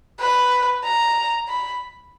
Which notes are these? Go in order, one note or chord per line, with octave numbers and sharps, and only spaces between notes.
B4
A#5
B5